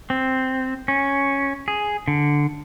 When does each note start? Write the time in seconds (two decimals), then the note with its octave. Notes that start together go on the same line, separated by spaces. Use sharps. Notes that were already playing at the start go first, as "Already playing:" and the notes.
0.10 C4
0.88 C#4
1.68 G#4
2.08 D3